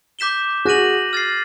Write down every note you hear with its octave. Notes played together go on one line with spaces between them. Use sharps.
D6 G6 B6 E7 G7
F#4 G#4 F#6 A#6 D#7 F#7
F6 A6 C7